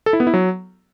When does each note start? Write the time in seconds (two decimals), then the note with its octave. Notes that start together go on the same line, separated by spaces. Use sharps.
0.06 A4
0.13 E4
0.20 B3
0.27 E4
0.34 F#3